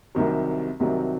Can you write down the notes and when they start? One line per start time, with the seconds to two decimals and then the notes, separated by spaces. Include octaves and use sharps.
0.15 C2 C3 D#3 F#3
0.80 C2 C3 D#3 F#3